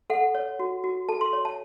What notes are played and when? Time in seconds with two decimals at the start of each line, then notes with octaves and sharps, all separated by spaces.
0.10 A4 F#5
0.35 C#5
0.59 F#4
0.84 F#4
1.09 A4 A5
1.21 C6
1.33 C#5
1.45 A5